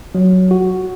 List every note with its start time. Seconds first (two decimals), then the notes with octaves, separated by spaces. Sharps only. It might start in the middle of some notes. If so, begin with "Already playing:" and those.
0.15 F#3
0.51 F#4